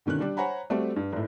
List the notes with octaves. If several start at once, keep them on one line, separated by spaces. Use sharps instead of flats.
B2 D3 D#3 C#4 F#6
G3 D4 G4
C5 C#5 F#5 G#5 A#5 B5
G3 A3 C4 F#4 G4
G2
G#1 A2